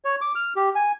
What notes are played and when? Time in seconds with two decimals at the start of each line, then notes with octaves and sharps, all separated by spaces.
0.05 C#5
0.21 D6
0.35 F6
0.56 G4
0.75 G#5